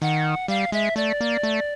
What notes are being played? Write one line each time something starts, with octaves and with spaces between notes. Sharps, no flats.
D#3 F#5
G3 F5
G#3 E5
A3 D5
A#3
A3